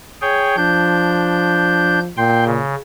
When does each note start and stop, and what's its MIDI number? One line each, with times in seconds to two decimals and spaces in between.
0.21 0.56 68
0.21 0.56 73
0.21 0.56 79
0.57 2.10 53
0.57 2.00 62
0.57 2.00 91
2.17 2.59 46
2.17 2.44 79
2.17 2.44 84
2.46 2.75 49